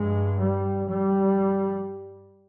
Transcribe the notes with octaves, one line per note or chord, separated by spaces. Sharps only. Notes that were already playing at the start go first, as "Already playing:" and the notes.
Already playing: G2 G#3
G3
G3